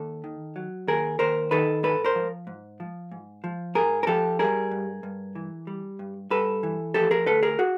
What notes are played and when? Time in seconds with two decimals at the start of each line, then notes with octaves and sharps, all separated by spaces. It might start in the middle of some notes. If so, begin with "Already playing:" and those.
Already playing: D#2 A4
0.24 D#3
0.56 F#3
0.88 D#2 G#4 A#4
1.19 D#2 A#4 C5
1.51 D#3 A4 B4
1.83 G#2 A4 B4
2.05 A#4 C5
2.15 F3
2.47 G#2
2.80 F3
3.12 G#2
3.44 F3
3.75 G#2 G#4 A#4
4.03 A#4
4.07 F3 G4 A4
4.39 G3 G#4 A#4
4.71 G2
5.03 G2
5.35 E3
5.67 G3
5.99 G2
6.30 G2 A4 B4
6.63 E3
6.94 F3 G4 A4
7.11 G#4 A#4
7.26 D2 A4 B4
7.43 G#4 A#4
7.59 F#4 G#4